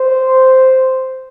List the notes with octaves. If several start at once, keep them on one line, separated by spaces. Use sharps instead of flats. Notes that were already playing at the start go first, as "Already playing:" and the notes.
Already playing: C5